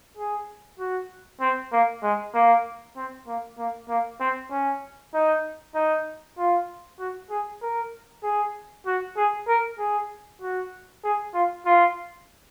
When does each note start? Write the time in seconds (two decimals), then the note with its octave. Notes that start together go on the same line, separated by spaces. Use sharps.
0.17 G#4
0.79 F#4
1.40 C4
1.72 A#3
2.03 G#3
2.34 A#3
2.96 C4
3.27 A#3
3.58 A#3
3.89 A#3
4.20 C4
4.51 C#4
5.14 D#4
5.75 D#4
6.38 F4
6.99 F#4
7.30 G#4
7.62 A#4
8.23 G#4
8.86 F#4
9.17 G#4
9.48 A#4
9.79 G#4
10.41 F#4
11.04 G#4
11.34 F4
11.66 F4